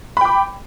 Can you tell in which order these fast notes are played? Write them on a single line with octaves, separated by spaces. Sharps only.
B5 G5 D6